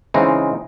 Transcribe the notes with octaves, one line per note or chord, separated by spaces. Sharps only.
C#3 E3 G#3 C4 D#4